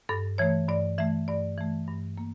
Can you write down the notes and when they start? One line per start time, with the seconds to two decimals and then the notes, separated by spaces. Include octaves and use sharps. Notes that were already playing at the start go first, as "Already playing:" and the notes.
0.09 G2 A4
0.38 E3 A3 C#5
0.69 G2 D5
0.98 E3 A3 E5
1.28 G2 D5
1.58 E3 A3
1.88 G2
2.18 A#3